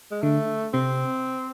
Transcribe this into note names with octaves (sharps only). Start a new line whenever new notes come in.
G#3
D3 A3
C3 C4